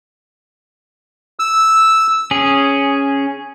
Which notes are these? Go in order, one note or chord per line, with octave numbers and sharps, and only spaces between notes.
E6
C#4 G#4